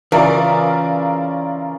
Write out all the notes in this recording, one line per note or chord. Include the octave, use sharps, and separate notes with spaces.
C#3 E3 F4 A#4 D5 E5